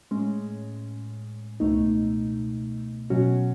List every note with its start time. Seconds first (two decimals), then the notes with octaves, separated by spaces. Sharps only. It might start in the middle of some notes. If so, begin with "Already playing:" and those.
0.11 A2 G#3 C#4
1.60 C#2 B2 A3 D#4
3.10 B2 F#3 C#4 F#4